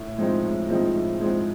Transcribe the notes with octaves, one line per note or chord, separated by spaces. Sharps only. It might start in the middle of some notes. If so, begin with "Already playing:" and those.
Already playing: A2
F3 G#3 C4 D#4
A2
F3 G#3 C4 D#4
A2
F3 G#3 C4 D#4